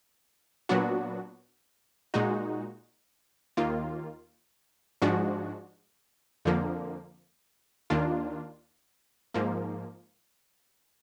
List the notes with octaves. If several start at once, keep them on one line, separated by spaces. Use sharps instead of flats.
A#2 F#3 B3 D4 F#4
A#2 G#3 D#4 F#4
D#2 D#3 A#3 F4
G#2 F3 G#3 D4 F#4
F2 D3 F3 A#3
D#2 D#3 A#3 D4 F4
G#2 F3 A#3